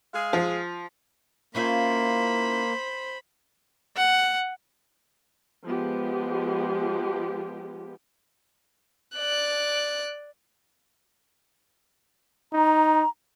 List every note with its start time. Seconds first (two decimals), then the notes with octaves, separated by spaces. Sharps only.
0.14 G#3 G#4 F5
0.33 F3
1.55 A#3 C#4 E4 F4 C5 B5
3.96 F#5
5.66 F3 G#3 B3 G4
9.17 D5 F#6
12.53 D#4 A#5